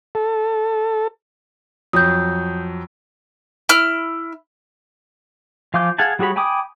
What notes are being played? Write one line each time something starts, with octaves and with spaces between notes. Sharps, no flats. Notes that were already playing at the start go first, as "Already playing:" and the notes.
A4
F2 F#3 D#6 G6
E4 F6
F3 F5 G#5 D6 G6
G#4 F5 F#5 G#5 A5
G3 F#4 G#4 C#5 B5
G5 G#5 B5 D6 D#6